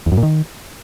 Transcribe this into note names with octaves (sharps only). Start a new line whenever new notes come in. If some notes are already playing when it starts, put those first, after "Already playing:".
E2
F#2
A#2
D#3